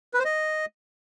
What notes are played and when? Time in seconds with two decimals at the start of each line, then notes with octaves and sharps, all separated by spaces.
0.14 B4
0.19 C5
0.25 D#5